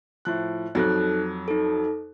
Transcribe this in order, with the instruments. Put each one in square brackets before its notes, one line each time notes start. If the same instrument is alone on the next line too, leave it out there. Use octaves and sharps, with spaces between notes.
[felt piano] A2 F3 F#6
[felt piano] F2 F#3 [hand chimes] D#4 A4 F#6
[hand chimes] D#4 A4